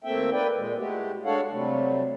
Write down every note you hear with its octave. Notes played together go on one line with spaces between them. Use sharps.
D#2 A3 A#3 C4 E5 G5
A#3 B4 D5 G5
A#2 G#3
G#3 A3 E4 F#4 G4
G#3 D4 A4 C#5 F5 F#5
C3 F#3 G3 A3